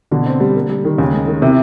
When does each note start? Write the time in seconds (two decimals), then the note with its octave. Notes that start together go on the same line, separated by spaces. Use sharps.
0.11 B2 D3
0.26 C4
0.40 G3
0.56 A#3
0.69 G3
0.84 D#3
0.98 D#2 C#3
1.13 G#3
1.27 D#3
1.42 C3 E4